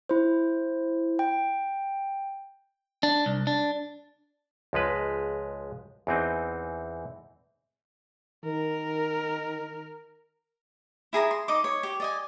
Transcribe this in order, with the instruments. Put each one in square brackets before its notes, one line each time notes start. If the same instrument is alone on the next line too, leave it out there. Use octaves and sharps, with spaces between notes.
[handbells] E4 C5
G5
[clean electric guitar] D4
C2
D4
[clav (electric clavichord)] C#2 F3 G#3 B4
E2 E3 C4 D#4
[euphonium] D#3 [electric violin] A#4
[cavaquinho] E4 G#4 A#5 D#6
C6
D#4 D#5 D6
C#5
G4 D6
D5 D#5 G#5